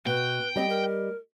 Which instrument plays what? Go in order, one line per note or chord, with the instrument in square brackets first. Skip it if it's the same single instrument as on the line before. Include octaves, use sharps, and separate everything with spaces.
[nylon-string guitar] B2 [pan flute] B4 [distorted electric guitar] G5
[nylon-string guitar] G3 D#5 [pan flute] C4
[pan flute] A#4